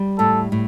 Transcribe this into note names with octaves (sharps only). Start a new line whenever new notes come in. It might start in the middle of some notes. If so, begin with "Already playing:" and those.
Already playing: G3
A2 A4
A2